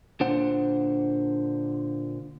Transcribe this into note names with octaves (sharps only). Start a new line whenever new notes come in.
A#2 D3 D4 C5 F#5